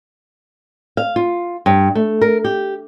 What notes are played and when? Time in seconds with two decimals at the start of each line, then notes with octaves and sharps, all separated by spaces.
0.97 F5
1.16 F4
1.66 G2
1.95 A3
2.22 A#4
2.44 G4